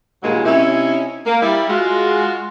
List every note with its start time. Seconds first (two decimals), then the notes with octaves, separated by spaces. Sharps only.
0.23 G2 A#2 D#3 F#3 G#3 A#3
0.45 C3 C#4 D#4 E4
1.26 A#3
1.42 G3 E4
1.68 G#3 F4 F#4